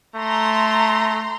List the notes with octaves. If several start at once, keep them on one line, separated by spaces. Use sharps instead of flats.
A3 A#5 C6